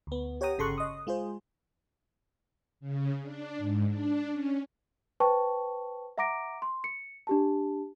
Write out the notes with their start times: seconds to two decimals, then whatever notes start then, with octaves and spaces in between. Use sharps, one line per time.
0.07 D2 B3
0.41 G4 C#5 F#5 G5 A#5 D#6
0.58 G1 C#3 A4 C6 C#6 F#6
0.78 D#5 D#6
1.07 G#3 F4 G#4 C5
2.80 C#3
3.21 D4
3.58 G#2
3.88 D4
4.31 C#4
5.20 B4 C5 G5 A5 C#6
6.18 E5 F#5 A#5 D6 A#6 D7
6.62 C6
6.84 C#7
7.27 D4 G4 A5